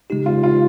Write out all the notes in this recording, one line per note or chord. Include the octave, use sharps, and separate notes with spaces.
C#3 G#3 D#4 G4
F4
F4